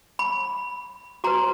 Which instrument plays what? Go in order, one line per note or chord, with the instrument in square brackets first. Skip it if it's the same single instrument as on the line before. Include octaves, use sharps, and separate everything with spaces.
[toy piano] B5
F#4 B4 A#5